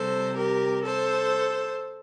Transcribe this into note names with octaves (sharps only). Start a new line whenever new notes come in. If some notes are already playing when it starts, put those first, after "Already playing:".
Already playing: C3 G3 A4 C5
G4 A#4
A4 C5